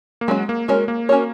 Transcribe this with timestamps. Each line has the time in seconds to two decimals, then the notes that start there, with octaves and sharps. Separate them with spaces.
0.21 A#3
0.28 F#3 G#3 C#4 F#4
0.49 A#3
0.68 G#3 C#4 F#4 A#4 C#5
0.88 A#3
1.09 C#4 F#4 A#4 C#5